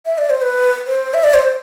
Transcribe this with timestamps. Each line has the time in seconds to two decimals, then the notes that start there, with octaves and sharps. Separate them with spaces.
0.06 E5
0.18 D5
0.30 C5
0.42 B4
0.87 C5
1.14 E5
1.24 D5
1.34 C5